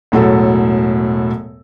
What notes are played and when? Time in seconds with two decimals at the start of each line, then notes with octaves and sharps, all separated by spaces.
0.12 E1 A2 F#3 A4